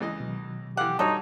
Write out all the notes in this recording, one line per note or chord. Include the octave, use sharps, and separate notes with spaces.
C#2 E3 D#5
B2 D#3 F#3
E3 G4 F5 F#5
G2 D#4 F#4 A4 C#5